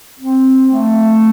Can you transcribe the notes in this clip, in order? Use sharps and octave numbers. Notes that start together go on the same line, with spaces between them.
C4
A3